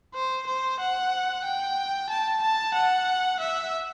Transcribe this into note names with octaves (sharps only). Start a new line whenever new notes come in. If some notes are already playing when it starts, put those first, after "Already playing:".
C5
C5
F#5
G5
A5
A5
F#5
E5